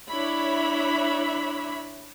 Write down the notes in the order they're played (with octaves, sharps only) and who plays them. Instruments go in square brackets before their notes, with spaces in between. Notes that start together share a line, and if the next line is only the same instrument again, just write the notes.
[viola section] D4 E4 C#5 E5 B5